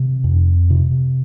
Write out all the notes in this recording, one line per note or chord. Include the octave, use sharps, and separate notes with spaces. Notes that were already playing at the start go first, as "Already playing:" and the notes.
Already playing: C3
F2
C3